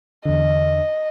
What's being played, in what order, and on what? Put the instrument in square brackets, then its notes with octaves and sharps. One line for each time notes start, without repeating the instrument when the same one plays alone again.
[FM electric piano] E2 D3 [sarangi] D#5